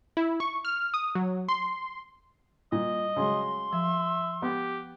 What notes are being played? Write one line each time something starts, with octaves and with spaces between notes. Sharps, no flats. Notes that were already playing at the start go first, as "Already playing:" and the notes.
E4
C#6
F6
D#6
F#3
C6
A#2 G3 D#5
C#3 F#3 G#3 C6
F3 E5
B3 G4